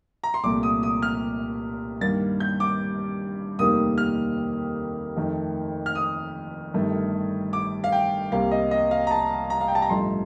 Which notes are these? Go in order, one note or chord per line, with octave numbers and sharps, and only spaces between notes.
A#5
C6
C2 A#2 A3 D6
D#6
D#6
F6
G2 D#3 A#3 A6
G6
D6
F1 D#2 D#3 G3 A#3 D#6
F6
F2 D#3 A3
F6
D#6
G1 G2 D#3 A3
D6
F5
G5
C2 C3 G3 A#3 F5
D#5
D#5
F5
A#5
A5
A#5
F5
G5
A5
A#5
A1 G2 F3 A3 C6